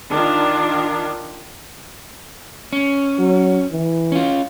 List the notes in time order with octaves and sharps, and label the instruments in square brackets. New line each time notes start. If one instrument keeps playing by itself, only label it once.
[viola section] D#3 D4 F4
[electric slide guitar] C#4
[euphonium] F#3
E3
[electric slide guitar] C#4 F4